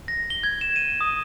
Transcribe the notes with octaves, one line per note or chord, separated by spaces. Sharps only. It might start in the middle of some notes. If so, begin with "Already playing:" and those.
A#6
G7
G#6
E7
D#7
D#6